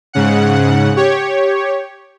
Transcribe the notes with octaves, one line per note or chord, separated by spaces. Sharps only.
G#2 C#3 F#5
G4 C#5